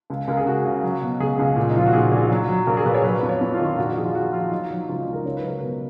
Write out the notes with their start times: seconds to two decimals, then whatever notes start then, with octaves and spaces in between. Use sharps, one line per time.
0.10 C#2
0.28 C#2 A#4
0.37 G#4
0.46 C#2 F#4
0.65 C#3
0.83 F#3
1.02 B2
1.20 C#2 G#4
1.39 C#2
1.56 A#2
1.70 D#4
1.75 F3 F4
1.86 F#4
1.93 A#2 G#4
2.12 A#1 G#4
2.31 F#3
2.49 F#3
2.67 A#1 A#4
2.77 G#4
2.86 A#1 B4
2.94 C#5
3.04 F#3 B4
3.16 B4
3.23 F2
3.29 C#5
3.41 F2 B4
3.54 F4
3.59 D#3
3.65 F4
3.78 A#1 F#4
3.97 F3 G#4
4.05 F4
4.14 F3 F#4
4.33 F3 F4
4.51 F#3 D#4
4.71 F#3
4.89 C#2 F4
5.00 D#4
5.07 C#2
5.13 A#4
5.25 C#2 C#5
5.37 B4
5.43 F#3 A#4
5.58 B2 B4